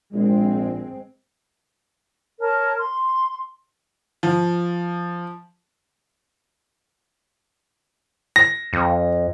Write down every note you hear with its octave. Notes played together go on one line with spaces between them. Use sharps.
A#1 G#3 C4
A#4 C#5 A5
C6
F3
A#6
F2